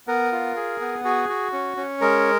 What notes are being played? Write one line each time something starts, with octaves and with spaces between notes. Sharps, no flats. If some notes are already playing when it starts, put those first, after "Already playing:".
B3 A#4
F4
G#4
B3
F#4 G#4
F#4
C#4
C#4
G#3 A#4